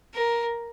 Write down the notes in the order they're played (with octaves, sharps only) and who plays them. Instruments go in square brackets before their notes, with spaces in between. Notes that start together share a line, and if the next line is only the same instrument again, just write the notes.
[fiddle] A#4